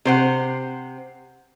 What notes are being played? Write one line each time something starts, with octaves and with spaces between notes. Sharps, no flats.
C3 C5 F#5